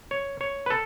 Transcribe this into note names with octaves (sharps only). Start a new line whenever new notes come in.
C#5
C#5
B4
A4